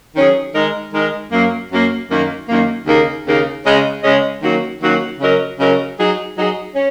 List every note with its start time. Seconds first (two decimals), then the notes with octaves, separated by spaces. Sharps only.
0.15 D#3 F#3 C#4 G#4
0.54 D#3 G#3 D#4 A#4
0.93 D#3 G#3 D#4 A#4
1.31 F#2 F#3 A#3
1.71 F#2 F#3 A#3
2.09 F#2 D#3 A#3
2.48 F#2 D#3 A#3
2.87 D#2 C#3 A#3 D#4 A#4
3.26 D#2 C#3 A#3 D#4 A#4
3.65 C#3 G#3 C#4 G#4 D#5
4.03 C#3 G#3 C#4 G#4 D#5
4.43 D#3 F#3 A#3 C#4 F#4
4.81 D#3 F#3 A#3 C#4 F#4
5.20 C#3 F#3 C#4 A#4 D#5
5.59 C#3 F#3 C#4 A#4 D#5
5.98 F#3 D#4 G#4
6.36 F#3 D#4 G#4
6.75 C#4